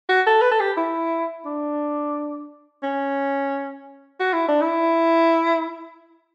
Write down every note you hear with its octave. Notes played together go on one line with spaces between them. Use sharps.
F#4
A4
B4
A4
G4
E4
D4
C#4
F#4
E4
D4
E4